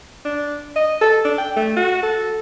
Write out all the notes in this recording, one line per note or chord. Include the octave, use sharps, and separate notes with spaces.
D4
D#5
A4
D4
G5
A3
F#4
A4